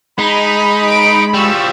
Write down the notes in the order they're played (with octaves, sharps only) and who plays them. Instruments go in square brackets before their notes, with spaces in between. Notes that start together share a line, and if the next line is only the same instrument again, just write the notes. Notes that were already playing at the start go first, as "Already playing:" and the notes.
[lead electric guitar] G#3 [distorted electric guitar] D#4 [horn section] B5
[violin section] D7
[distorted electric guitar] F3 G3 [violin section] C#6 E6